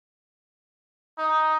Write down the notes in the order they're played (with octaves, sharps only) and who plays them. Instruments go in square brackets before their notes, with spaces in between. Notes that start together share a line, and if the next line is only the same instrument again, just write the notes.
[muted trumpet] D#4